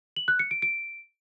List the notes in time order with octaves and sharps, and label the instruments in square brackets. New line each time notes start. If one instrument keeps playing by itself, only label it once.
[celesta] F#7
F#6
C#7
D7
D7